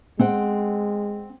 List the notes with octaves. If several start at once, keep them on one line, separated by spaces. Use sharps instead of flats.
G#3 C4 F#5 G5